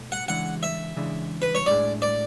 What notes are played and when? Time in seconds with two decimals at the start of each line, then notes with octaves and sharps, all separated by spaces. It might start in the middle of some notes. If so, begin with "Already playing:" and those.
Already playing: B2 A3
0.12 F#5
0.28 C#3 E3 G#3 D4 F#5
0.63 E5
0.96 C#3 E3 G#3 D4
1.42 B4
1.55 C#5
1.66 A2 G#3 D4 G#4 D5
2.02 D5